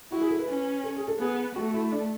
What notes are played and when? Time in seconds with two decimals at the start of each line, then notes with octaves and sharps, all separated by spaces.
0.12 E4 F#4
0.21 G#4
0.30 A4
0.39 B4
0.49 C#4
0.84 A4
0.96 G#4
1.08 A4
1.19 B3 G#4
1.56 A3 F#4
1.74 E4
1.92 D4